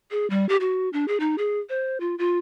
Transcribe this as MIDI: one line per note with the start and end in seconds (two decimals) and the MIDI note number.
0.11 0.29 68
0.30 0.47 55
0.49 0.57 67
0.60 0.89 66
0.93 1.05 62
1.08 1.17 68
1.20 1.36 63
1.38 1.59 68
1.69 1.98 72
2.00 2.15 65
2.19 2.38 65